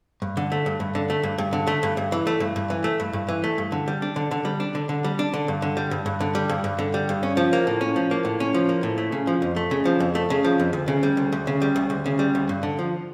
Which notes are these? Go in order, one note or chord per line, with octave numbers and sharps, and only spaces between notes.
G2
D3
A3
G2
G2
D3
A3
G2
G2
D3
A3
G2
G2
E3
A3
G2
G2
E3
A3
G2
G2
E3
A3
G2
D3
G3
D4
D3
D3
G3
D4
D3
D3
G3
D4
D3
G2
D3
G3
G2
G2
D3
G3
G2
G2
D3
G3
G2
C#4
F3
A#3
A2
C#4
F3
A#3
A2
C#4
F3
A#3
A2
A3
C#3
F3
F2
A3
C#3
F3
F2
A3
C#3
F3
F2
D2
C#3
G3
D2
D2
C#3
G3
D2
D2
C#3
G3
D2
G2
D3
F3